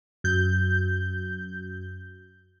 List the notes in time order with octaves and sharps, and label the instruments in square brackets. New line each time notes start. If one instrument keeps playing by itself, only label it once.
[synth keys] F#2 G6